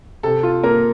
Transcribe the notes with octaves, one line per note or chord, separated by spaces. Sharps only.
C3 A4
F4
A#3 A#4